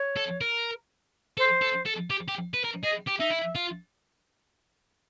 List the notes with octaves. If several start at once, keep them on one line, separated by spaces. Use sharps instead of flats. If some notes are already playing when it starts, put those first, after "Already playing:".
Already playing: C#5
A4
A#4
A4 C5
A4
A4
G4
G4
B4
A#4
G#4 D#5
G4
D#4 E5
E4
F4